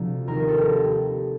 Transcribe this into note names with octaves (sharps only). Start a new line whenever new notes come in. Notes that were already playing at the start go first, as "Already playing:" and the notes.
Already playing: D2 C3 F3
D#2 D#3 A#4
A4
G4